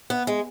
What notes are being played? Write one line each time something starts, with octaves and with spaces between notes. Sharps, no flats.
B3
G#3